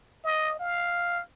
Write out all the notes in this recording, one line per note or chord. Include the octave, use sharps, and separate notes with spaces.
D#5
F5